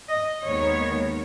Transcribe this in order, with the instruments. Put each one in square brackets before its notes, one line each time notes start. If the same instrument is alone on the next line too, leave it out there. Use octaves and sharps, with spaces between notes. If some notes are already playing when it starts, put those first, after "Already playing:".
[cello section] D#5
D#2 D#3 G#3 B3 C#5